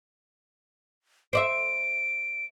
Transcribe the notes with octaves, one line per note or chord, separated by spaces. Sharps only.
C5 D5 E5 D7